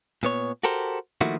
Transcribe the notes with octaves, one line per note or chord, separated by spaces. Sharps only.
A#2 B3 C#5
F#4 G4 A4 A#4 C5
D#3 F3 A3 A#3 E4 F#4